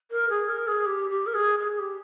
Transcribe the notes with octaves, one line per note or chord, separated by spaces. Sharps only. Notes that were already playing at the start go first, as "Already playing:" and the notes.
A#4
G#4
A#4
G#4
G4
G4
A#4
G#4
G#4
G4